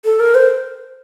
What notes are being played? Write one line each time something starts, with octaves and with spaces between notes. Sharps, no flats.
A4
A#4
C5